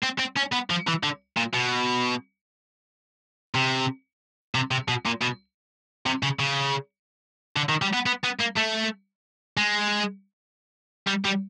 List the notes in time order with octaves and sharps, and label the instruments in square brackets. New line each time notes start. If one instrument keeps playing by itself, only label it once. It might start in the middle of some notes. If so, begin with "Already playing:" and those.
[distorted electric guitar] C4
C4
C#4
B3
F3
E3
D3
A#2
B2
C3
C3
C3
B2
A#2
B2
C3
C#3
C#3
D3
D#3
G3
B3
B3
B3
A#3
A3
G#3
G3
G3